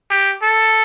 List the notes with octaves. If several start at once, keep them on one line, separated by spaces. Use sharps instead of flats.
G4
A4